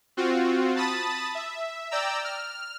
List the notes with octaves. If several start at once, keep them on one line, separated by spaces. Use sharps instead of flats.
C4 F4 F#4
A5 B5 D#6 A6
E5
D5 G5 A#5 E6
F6